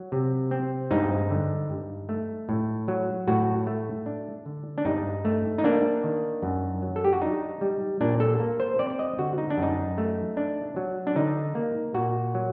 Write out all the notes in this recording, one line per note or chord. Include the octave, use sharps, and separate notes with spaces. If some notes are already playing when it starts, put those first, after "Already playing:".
Already playing: F#3
C3
C4
G2 D#4
D3
G2
A3
A2
F#3
A2 F#4
A3
D4
D3
D4
G2 D#4
A3
D#4
A#3 D4
D#3
F#2
F#3
A4
G4
F#4
D4 D#4
G3
A#2 D4
A4
A#3
C5
C4 D5
D5
D#5
D3 F#4
D#4
D4
F#2 D#4
A3
D4
F#3
D4
D3 D#4
A#3
A#2 F#4
F#3